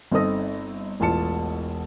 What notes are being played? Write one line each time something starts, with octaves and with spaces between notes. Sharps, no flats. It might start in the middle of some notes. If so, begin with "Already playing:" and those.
G1 C4 D#4 A4 D#6 A#6
E1 A1 F4 A5 C#7